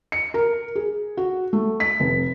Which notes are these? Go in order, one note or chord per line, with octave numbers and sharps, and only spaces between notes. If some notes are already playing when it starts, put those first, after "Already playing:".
C#7
A#4
G#4
F#4
A3
B6
F1